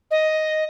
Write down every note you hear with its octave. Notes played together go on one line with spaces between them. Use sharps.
D#5